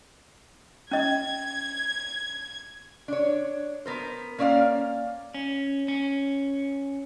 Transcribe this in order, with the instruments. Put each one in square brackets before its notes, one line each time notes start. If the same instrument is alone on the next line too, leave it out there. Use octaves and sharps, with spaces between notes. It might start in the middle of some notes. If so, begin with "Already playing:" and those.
[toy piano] C#4 D#5 [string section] G#6
[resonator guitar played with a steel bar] D4 C#5
B3 A#4 C5
A#3 C#4 D5 E5 F5
[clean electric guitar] C#4
C#4